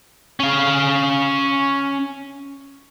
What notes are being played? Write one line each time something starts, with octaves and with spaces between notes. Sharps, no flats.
C#4 F5